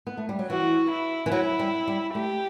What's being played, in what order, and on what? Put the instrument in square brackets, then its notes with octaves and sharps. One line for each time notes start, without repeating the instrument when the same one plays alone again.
[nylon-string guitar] B3
A3
G3
F#3
[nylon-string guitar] E3 [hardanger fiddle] F#4
[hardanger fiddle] E4
[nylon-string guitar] E3
[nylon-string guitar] F#3 [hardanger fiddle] E4
[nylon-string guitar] G3
G3
[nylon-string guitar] A3 [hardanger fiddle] G4